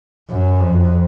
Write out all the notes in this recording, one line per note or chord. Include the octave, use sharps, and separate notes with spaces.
F#2
F2